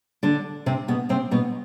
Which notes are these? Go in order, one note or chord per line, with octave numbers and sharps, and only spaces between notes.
D3 D4
C3 C4
B2 B3
C3 C4
B2 B3